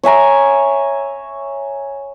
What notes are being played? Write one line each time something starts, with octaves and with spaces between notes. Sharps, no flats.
C#5 E5 G#5 A#5